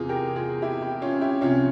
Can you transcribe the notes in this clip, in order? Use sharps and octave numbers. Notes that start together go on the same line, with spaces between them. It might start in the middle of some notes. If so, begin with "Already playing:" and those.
Already playing: E2 C3 E3 F4 G#4
G4 A#4
F4 G#4
E4 G4
E4 G4
C#4 F4
E4 G4
C2 C3 F3 C#4 F4